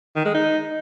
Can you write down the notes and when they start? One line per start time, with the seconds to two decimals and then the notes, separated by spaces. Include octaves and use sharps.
0.16 D#3
0.26 G#3
0.35 D#4